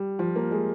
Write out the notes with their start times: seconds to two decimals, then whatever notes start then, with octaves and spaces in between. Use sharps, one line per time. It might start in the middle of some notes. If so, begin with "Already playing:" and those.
Already playing: G3
0.19 F3
0.36 A#3
0.51 G#3